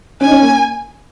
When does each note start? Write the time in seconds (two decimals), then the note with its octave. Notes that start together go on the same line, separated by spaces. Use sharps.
0.21 C#4 G#5
0.27 D#4
0.31 C#4
0.41 A#3